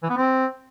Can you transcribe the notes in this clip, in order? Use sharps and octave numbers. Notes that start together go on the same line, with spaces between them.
E3
B3
C4